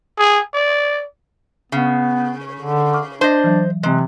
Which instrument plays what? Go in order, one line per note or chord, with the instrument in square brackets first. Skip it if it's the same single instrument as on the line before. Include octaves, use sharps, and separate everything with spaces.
[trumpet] G#4
D5
[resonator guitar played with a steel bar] C#3 [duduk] B3
[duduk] D3
[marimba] C#6 D6 F6
[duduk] D4 [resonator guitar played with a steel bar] C5 D#5 [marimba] C6
[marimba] E3 F#3
[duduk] C3 [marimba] E3 C4 [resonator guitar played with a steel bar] G#3